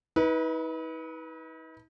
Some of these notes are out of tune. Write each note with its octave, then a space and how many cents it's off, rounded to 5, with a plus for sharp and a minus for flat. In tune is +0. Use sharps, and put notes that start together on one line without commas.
D#4 +45 B4 -15